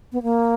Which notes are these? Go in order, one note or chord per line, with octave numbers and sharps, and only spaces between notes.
B3
A#3